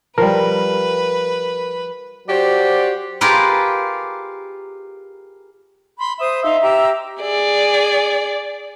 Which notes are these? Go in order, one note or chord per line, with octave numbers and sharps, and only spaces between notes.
F3 G3 A#4 B4
F#3 F#4 G4 C5 D5
F4 G4 G#4 A#4 B4
B5 C6
C5 E5 D#6
D#4 E5 F5 C6
G4 A#5 E6
G#4 D5